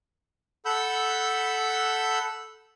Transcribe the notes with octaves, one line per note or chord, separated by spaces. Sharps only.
A4 F#5 B5 E6 G6